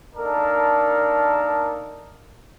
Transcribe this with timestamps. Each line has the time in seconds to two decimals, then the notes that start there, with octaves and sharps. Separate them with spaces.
0.16 A#3 D4 D#4 A4 A#4